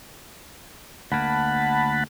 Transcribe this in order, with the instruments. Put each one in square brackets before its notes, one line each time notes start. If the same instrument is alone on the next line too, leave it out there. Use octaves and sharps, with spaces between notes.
[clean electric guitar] D2 A#3 [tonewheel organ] F#5 A5 B5